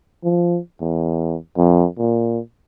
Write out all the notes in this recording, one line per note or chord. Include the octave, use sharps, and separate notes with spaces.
F3
E2
F2
A#2